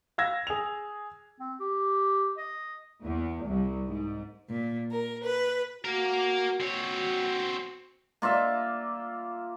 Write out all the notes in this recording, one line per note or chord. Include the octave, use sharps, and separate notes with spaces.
F5 E6 G#6 A#6
G#4 F7
C4
G4
D#5
E2
C2
G#2
A#2
A#4
B4
A#3 F#4 A#4
C4 F#4 C#5
A#3 F4 D5 E5